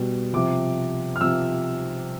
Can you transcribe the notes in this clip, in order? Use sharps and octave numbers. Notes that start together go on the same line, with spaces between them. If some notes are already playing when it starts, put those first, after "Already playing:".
Already playing: B2 G3
C3 F3 D6
F6
C3 F3 E6